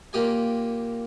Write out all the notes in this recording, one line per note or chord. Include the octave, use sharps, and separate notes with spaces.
A#2 A#3 G4 G#5